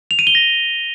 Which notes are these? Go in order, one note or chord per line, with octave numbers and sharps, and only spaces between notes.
F7
D#7
G7
A#6